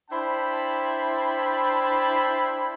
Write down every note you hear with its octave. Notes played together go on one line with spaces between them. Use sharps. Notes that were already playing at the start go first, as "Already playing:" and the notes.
D4 E4 C5 G5 A5 B5